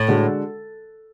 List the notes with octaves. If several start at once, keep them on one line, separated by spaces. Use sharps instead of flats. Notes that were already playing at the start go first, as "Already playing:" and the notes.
Already playing: A2
D3 G#3 D4 F#4